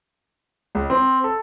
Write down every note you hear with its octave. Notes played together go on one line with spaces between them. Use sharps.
C#2
C4
A4